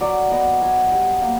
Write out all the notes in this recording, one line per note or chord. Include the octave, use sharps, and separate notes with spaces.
F#3 D5
B3 D#5
F#3 G#5
G3 G5
A#3 F5